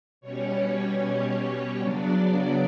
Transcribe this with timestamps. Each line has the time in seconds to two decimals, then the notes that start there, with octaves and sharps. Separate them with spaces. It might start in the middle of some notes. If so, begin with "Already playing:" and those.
0.21 B2 G3 C#4 C#5
1.80 C#3 F#3 B3 D4 D5